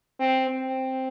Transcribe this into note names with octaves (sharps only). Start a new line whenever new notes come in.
C4
C4